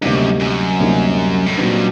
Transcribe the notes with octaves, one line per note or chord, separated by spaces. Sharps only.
D2 G2 C3 G3 A#3 D#4
F#2
F#2
D2 C3 G3 A#3 D#4
A2
G2 A#2 F#3 C4 D#4